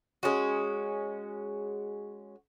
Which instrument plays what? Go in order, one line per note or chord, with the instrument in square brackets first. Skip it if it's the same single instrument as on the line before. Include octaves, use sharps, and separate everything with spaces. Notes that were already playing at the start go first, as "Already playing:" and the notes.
[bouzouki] G#3 C#4 F#4